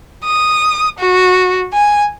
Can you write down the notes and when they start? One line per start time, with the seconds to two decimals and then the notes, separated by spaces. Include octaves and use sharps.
0.25 D#6
0.99 F#4
1.74 G#5